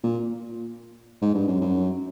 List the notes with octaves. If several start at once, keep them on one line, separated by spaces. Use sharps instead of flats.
A#2
G#2
G2
F#2
F#2